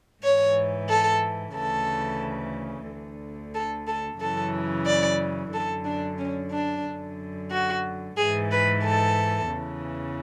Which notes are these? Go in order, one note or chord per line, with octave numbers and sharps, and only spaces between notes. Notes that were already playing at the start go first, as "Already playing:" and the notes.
G#2 E3 C#5
A4
D2 C#3 E3 A4
D2 D3
A4
A4
F#2 C#3 E3 A4
D5
F#2 D3 A4
D4
C#4
D4
F#2 D3
F#4
G#2 E3 G#4
B4
A4
E2 C#3 E3